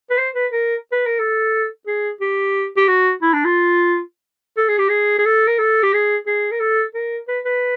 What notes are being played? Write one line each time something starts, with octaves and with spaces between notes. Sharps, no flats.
B4
C5
B4
A#4
B4
A#4
A4
G#4
G4
G4
F#4
E4
D4
F4
A4
G#4
G4
G#4
G#4
A4
A#4
A4
G4
G#4
G#4
A#4
A4
A#4
B4
B4